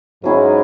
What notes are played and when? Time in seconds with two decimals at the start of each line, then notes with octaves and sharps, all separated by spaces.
0.24 G#2 F#3 C#4 E4 G#4